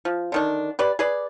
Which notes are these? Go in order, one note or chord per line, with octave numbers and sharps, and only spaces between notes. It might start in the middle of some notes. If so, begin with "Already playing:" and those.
F3
D3 D#3 D4
G4 B4 D5
G#4 B4 D5